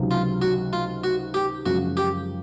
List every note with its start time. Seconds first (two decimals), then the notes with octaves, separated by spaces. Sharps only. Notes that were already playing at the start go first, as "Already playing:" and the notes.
Already playing: C#2 C3 D#3 F#3
0.11 F4
0.42 F#4
0.73 F4
1.04 F#4
1.34 G4
1.66 F#2 C#3 F3 G#3 F#4
1.97 G4